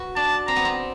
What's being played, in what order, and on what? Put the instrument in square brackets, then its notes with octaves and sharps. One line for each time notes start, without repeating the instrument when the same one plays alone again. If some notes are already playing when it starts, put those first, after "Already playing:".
Already playing: [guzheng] F#4 B4
[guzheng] D4 [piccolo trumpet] A5
[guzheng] C4 [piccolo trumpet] A#5
[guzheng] B3
C4